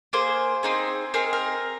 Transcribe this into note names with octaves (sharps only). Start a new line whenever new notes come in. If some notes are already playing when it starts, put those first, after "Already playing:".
A#3 G#4 C5
C4 D#4 G#4
C4 D#4 G#4 A#4
A#4